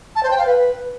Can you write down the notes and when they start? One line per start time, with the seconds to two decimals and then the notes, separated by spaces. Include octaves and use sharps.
0.16 A5
0.23 C5
0.31 G5
0.38 F5
0.46 B4